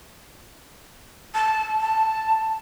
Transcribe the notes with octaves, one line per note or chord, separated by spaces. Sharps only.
A5
A5